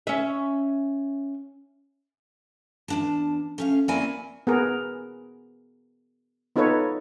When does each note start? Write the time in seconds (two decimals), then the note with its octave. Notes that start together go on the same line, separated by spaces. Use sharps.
0.07 C#4 E5
2.88 E2 D4 A5
3.58 A3 C#4 F5
3.88 A#3 C4 C#4 E4 D5 G#5
4.47 B3 G#4 A#4
6.56 B3 D#4 F4 A4 B4 C#5